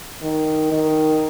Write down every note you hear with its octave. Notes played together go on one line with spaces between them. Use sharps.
D#3
D#3